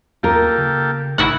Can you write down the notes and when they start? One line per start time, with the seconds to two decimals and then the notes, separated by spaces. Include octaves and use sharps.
0.23 D#2 A#3 F4 G4 A4 A#4
0.58 C#3
1.18 A1 E4 F#4 F#5